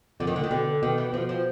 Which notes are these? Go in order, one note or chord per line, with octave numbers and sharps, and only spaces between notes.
F2 D3
D#3
A2
D3
A#2 D#3
B2 D3
B2 D#3
E3
B2 F3
F3